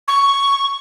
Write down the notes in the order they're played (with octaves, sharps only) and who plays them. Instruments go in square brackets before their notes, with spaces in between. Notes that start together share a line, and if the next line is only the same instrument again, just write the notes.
[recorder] C#6